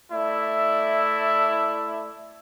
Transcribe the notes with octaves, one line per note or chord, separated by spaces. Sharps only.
A3 E4 D5 E5